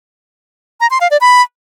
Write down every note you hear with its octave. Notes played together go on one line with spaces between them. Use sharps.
A#5
C6
F5
D5
B5